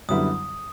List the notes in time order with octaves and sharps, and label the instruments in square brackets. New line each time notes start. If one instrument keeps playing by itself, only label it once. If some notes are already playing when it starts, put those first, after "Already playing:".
[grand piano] F#2 D3 G3 B3 E4 [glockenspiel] D#6